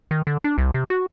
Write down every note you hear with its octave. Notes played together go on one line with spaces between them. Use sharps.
D#3
D3
D4
C2
C3
F#4